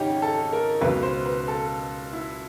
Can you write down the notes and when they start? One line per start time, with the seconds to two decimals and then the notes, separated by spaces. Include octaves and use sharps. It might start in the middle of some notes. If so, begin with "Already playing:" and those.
Already playing: G#1 C#3 C#4 D#4 G4
0.22 A4
0.52 A#4
0.81 C#2 B2 B4
1.03 C5
1.26 B4
1.48 A4
2.13 E4